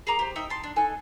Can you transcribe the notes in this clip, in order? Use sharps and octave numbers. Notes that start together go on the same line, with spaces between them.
G#4 A#4 A#5 D6
G4 C5
D#4 E5 G5
G5 A5 C6
D4
D#4 A4 G#5 F#6